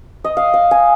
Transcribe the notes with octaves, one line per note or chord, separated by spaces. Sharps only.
D#5
F5
F5
G#5